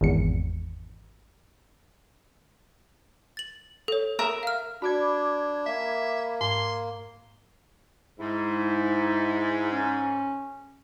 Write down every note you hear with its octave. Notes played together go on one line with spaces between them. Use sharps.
G#1 E2 C#7
A6 F#7
A4 C#5
A#4 E5 D#6
F5 F6
D4 F#4 D5 B5 D6 G#6
A#3 E5
G#2 C6
G#2 E4
C#4